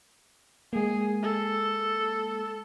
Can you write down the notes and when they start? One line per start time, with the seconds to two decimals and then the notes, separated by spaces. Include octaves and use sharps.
0.73 G#3 A#3 G#4
1.23 A4